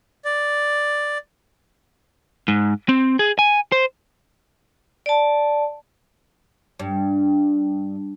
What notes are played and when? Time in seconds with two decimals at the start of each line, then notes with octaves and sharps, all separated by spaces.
0.25 D5
2.48 G#2
2.89 C4
3.19 G#4
3.39 G#5
3.72 C5
5.06 D5 A5
6.79 G2